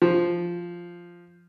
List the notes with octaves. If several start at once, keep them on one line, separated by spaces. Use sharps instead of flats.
F3